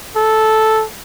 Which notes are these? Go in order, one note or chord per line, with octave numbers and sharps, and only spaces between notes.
A4